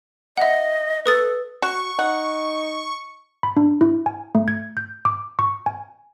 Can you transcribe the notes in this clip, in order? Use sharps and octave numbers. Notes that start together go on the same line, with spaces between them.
D#5 E5 F#5
A4 B4 D#6 A6
F#4 C#6
D#4 F#5
B5
D4
E4
G#5
A3
G#6
G6
D6
C#6
G#5